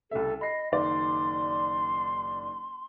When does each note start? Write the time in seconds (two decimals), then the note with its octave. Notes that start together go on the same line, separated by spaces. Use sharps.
0.11 C2 C#3 A4 E5
0.41 D#5 B5 C7
0.72 F#1 D#3 D5 C6